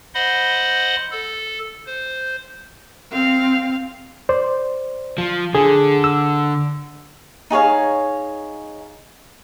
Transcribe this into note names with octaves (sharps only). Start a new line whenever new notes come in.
C5 D#5 F#5 B5 C6
A4
C5
C4 F5
C5 D5
F3
D3 G#4
E6
D#4 G#4 C#5 F5